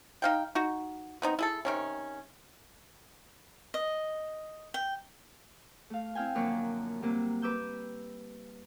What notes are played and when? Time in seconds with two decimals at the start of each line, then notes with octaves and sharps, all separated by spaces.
0.22 D#4 F5 G5
0.55 D#4 F#4
1.22 B3 C4 D#4
1.39 E4 G#4 A4
1.65 C3 D#3 C#4
3.74 D#5
4.74 G5
5.90 A3 F5
6.15 C4 E4 F5 G5 G#5
6.35 F#2 D3 F3 F#3 A#3 C#5
7.02 C3 F#3 G3 A#3
7.42 B4 D6 E6 G6